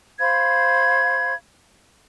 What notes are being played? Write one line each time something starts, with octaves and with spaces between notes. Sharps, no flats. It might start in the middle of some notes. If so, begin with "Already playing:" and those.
C5 F5 B5 G#6